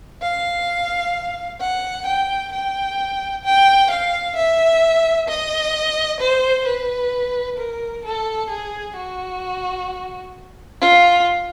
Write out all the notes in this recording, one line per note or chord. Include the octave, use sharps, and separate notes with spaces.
F5
F#5
G5
G5
G5
F5
E5
D#5
C5
B4
A#4
A4
G#4
F#4
F4